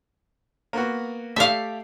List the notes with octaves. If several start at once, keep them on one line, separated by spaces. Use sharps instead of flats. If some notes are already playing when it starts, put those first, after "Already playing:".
A#3 B3 F#4
A3 G4 D5 E5 F5